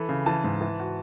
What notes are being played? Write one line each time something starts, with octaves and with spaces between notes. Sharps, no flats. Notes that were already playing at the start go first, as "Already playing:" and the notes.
Already playing: E3 A4 B5
C#3
E3 A5
G#2
E3
F#4